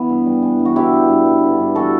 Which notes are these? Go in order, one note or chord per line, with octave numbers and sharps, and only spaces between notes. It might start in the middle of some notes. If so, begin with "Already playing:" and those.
Already playing: E3 B3
G2
G3
E3
G2
F#4
D3 E4 G4
G2
G2
G3
D3
G2
E3 F#4 A4